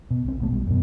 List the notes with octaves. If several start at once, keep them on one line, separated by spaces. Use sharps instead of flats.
B2
B1 C4
A#1 B2 A3
B1 G3
F#2 B2